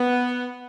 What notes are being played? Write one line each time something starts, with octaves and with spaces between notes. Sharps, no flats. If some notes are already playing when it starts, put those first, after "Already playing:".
Already playing: B3